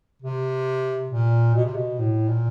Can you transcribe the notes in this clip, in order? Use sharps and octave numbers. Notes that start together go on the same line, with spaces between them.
C3
A#2
B2
C3
B2
A2
A#2